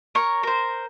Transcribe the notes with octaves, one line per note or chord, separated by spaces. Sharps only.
A#4 C#5 C#6
A#4 C5